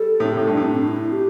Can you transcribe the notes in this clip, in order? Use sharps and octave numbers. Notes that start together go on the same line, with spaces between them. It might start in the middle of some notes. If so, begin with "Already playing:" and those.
Already playing: G3 A4
A2
C3
A2 E4
G2 D4
A2
C4
D4
E4
G4